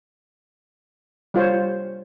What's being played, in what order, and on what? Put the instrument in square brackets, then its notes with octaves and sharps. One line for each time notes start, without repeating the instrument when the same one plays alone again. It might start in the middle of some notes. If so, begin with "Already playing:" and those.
[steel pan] G3 F4 C5 C#5